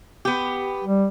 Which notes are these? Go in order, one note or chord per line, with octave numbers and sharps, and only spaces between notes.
B3 G4
G3